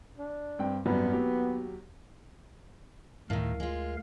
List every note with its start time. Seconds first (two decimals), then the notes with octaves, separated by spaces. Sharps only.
0.18 D4
0.59 G2 C4 G5
0.86 G#1 F#2 G3 B3
1.13 D#2 F#3 G4
3.30 D2 A2 D#3 A#4 F5
3.60 G#3 F4